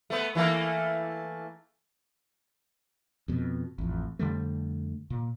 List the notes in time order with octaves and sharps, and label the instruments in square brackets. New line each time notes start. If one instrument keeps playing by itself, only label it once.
[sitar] A3 B3
E3 A3 A#3
[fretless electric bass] F2 B2
A1 F2
F2 D3 G3 A3
A#2